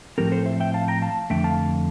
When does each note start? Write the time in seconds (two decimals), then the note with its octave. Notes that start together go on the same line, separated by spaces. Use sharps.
0.18 A2 F3 C4 G4 A#4
0.32 A4 C5
0.46 C5 E5
0.60 E5 G5
0.74 F5 A5
0.88 G5 A#5
1.02 F5 A5
1.30 F2 D3 A3 E5 G5
1.44 F5 A5